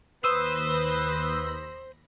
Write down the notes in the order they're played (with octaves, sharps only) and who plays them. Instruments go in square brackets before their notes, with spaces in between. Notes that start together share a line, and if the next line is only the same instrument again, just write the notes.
[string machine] D#2 B5 A#6 [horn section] B4 [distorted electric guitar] C5 [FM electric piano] D#6 E6